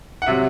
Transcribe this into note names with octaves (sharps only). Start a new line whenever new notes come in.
F#5
C3 F#3 E5